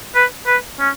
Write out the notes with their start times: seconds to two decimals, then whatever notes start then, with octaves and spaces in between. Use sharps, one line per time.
0.15 B4
0.47 B4
0.80 C#4